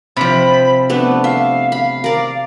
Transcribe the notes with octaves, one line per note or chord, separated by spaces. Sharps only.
C3 F3 B5
A3 B3 D4 B4
E5 F5
F5 B5
A#4 D5